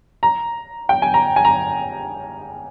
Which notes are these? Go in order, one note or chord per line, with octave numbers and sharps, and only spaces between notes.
A#5
G5
G#5
A#5
G#5
A#5